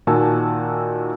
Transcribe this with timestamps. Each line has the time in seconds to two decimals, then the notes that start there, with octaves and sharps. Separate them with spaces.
0.07 A#2 D#3 F#4 G#5 A5 E6